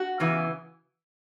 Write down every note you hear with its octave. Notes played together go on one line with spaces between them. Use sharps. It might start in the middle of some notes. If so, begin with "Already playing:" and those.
Already playing: F#4
E2 C#3 E3